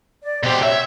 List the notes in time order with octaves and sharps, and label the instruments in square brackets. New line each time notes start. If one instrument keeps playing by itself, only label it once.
[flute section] D5
[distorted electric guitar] B2 G4 [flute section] C5
[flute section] C#5 [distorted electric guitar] E5